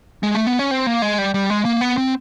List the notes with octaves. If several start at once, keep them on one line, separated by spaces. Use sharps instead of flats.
G#3
A3
B3
C#4
C4
A#3
G#3
G3
G3
G#3
A#3
B3
C4